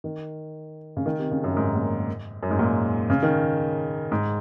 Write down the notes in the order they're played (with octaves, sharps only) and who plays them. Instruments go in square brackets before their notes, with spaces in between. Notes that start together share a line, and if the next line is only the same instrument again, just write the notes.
[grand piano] D#3
C#3
D#3
C3
C#3
F#2
G#2
A#2
F#2
G#2
A#2
C#3
D#3
G#2